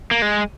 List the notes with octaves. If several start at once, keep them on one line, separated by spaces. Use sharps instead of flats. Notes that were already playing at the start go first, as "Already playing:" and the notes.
A#3
G#3